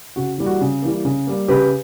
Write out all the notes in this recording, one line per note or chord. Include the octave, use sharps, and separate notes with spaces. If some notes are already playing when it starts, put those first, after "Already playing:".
C#3 F#4
E3 G3 A#3
F#4
C#3
E3 G3 A#3
C#3
G3 A#3
C#3 G4 B4